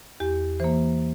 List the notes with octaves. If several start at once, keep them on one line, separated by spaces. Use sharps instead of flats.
E2 G4
E3 A#3 C5